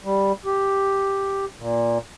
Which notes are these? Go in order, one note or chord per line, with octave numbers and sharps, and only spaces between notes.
G3
G4
A#2